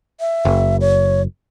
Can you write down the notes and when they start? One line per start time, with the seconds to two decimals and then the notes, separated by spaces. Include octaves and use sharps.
0.20 E5
0.45 F#1
0.81 C#5